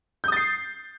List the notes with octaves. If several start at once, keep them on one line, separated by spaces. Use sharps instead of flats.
D#6 G6 A6 C7